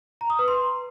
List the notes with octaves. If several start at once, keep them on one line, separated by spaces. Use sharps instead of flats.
A#5
D#6
B4
C6